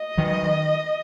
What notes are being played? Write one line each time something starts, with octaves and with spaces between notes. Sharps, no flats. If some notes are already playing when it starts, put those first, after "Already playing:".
Already playing: D#5
D#3 F#3